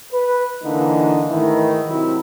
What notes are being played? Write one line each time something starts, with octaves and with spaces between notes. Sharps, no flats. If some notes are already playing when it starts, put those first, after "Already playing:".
B4
D3 E3 A#3 D4 D#4
G#2 D#3 E3 A3 E4
C3 D#3 F#3 E4